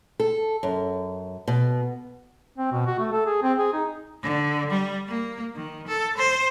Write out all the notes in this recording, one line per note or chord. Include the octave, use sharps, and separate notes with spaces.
A4
F#2
B2
C4
B2
F#4
A3
A4
G#4
C4
G#4
D#4
D3
G3
A#3
D#3
A4
C5